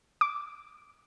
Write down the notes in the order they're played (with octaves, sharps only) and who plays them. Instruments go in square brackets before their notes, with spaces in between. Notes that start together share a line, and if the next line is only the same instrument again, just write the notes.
[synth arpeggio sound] D6